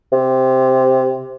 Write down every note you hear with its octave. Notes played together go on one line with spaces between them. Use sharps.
C3